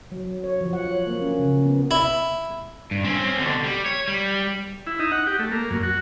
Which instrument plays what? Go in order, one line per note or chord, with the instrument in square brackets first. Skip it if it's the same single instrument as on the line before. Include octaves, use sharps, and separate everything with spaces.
[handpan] F#3
C#5
F3
F#5
C#5
A#3
C#4
C#3
B3
[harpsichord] E4
[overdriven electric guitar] G2
C4 C#4
B2 D3
G3
C#5
G3
[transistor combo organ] E4
D#4
F#5
G4
A3
A#3
F#2
F#4